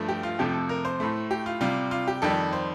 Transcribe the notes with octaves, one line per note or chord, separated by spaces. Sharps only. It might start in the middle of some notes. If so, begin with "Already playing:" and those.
Already playing: G2 F3 A3
G4
F4
F2 C3 F3 A3 G4
A4
A#4
C5
A2 A3
G4
F4
C3 G3 F4
F4
G4
F2 D#3 G3 A4
C5